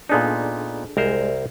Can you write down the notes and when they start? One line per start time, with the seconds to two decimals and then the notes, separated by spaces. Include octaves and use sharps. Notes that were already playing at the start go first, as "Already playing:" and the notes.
0.09 A#2 B3 D4 D#4 G#4 A4
0.97 C2 G#3 A#4 C5